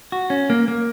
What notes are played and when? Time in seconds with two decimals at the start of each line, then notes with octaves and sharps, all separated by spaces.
0.12 F#4
0.30 C#4
0.50 A#3
0.68 A#3